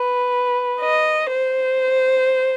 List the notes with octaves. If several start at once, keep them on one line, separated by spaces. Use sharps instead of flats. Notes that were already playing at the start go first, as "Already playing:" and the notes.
Already playing: B4
D#5
C5